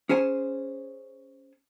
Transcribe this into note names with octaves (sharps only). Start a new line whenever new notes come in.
C#4 G#4 C5 G#5